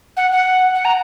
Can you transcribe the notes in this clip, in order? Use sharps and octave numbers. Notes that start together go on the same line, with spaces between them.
F#5
F#5
F#5
A#5